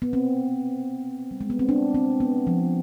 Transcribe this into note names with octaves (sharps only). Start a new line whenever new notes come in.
B3
C4
G3
G#3
B3
C4
D4
C4
B3
F3